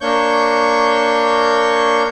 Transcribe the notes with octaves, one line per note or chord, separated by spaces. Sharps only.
A#3 D4 C#5 C#6 G6